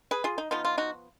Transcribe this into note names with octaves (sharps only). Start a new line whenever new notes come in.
G#4 B4
F4 G#4
D#4
F3 B3 D#4 F4
F4
D#4 F#4